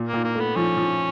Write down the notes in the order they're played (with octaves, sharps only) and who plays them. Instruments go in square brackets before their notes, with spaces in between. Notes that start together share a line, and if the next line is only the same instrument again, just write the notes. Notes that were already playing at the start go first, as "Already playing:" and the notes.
Already playing: [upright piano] A#2
[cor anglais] A#3
[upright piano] A#2
[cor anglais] A#3
[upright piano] A3 [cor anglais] B3
[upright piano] F3 [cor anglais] C#4
[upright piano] F3